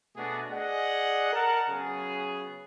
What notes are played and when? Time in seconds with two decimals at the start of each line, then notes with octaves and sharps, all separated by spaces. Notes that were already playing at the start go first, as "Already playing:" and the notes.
0.16 B2 A3 B3 D4 F#4 G#4
0.52 G#4 D5 D#5 F#5
1.33 A#4 F#5 A5
1.69 C#3 F#3 B3 G#4